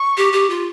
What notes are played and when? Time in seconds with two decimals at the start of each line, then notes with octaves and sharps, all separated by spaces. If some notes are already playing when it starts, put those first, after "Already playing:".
Already playing: C#6
0.17 G4
0.33 G4
0.50 F4